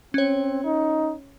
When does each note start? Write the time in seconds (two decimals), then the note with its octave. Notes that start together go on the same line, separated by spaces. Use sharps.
0.14 C4 C#4 C#5
0.64 D#4